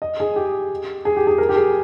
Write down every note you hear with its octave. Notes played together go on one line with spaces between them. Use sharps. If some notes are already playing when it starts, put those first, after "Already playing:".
D#5
G#4
G4
G#4
G4
G#4
A#4
G4
G#4